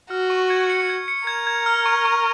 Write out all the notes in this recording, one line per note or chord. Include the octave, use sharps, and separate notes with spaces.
F#4 F6
C#6
G#6
C#7
G#6
C#7
A#4 G#6
G#6
F6
C#6
C#6